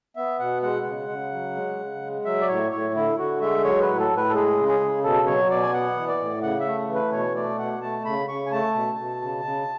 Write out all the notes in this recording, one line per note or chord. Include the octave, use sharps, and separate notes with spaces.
B3 E5
B2 F#5
G#3 F#5
C#3
C#3
F#3
G#3
C#3
G#3
F#3 E5
D5
A2 C#5
A2 C#5
D3 E4
D3 F#4
G#3 E5
F#3 C#5
B4
A2
A4
A2
B4
A4
G#3 G#4
C#3
G#4
C#3
B2 A4
F#3 C#5
B2 D5
G#5
B3 F#5
E3
D5
A2
C#3 F#5
E5
A3
E3
B4
B2 C#5
A3 D5
B2 F#5
A3 A5
C#3 B5
C#3 C#6
G#5
A3 A5
B2
B2
C#3
C#3